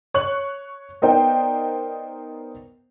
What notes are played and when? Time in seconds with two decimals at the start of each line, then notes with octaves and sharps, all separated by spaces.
0.14 C#5 C#6 F#6 F#7
1.02 B3 D#4 A#4 C5 D5 G5